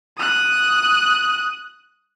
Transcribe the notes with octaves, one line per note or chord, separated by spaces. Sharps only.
D#6 F#6